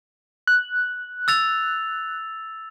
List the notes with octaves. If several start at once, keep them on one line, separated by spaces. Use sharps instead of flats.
F#6
E6 A6 F7